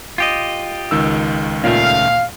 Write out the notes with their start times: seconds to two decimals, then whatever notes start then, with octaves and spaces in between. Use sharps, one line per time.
0.18 F4 G4 D#5
0.91 C#2 D#3 E6
1.64 D#2 A#2 C#3 A3 F5